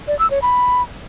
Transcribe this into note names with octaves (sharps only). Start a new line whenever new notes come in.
D5
E6
C#5
B5